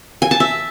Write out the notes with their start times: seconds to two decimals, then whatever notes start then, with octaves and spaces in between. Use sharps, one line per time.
0.22 G#5
0.31 A5
0.40 E5